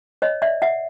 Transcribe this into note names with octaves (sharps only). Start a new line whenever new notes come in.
C#5 D#5
D5 E5
E5 F#5